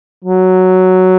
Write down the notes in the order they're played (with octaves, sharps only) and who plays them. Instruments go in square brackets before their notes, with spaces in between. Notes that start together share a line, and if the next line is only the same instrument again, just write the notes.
[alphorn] F#3